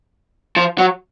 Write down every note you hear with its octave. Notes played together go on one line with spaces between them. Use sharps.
F3
F#3